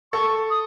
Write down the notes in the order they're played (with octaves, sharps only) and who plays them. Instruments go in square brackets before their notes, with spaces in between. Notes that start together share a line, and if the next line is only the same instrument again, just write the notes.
[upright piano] A4 [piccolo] C#6
[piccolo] D#6